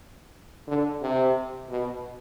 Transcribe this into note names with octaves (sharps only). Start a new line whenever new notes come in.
D3
C3
B2